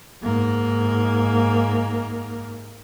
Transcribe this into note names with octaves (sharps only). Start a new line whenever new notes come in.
G#2 A#3